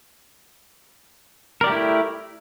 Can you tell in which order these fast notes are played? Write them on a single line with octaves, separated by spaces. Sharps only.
A#4 D5 G4 A3 E4